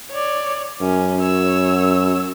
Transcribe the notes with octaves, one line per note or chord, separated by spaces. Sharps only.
C#5 D5
F#2 C#4
C#5 E6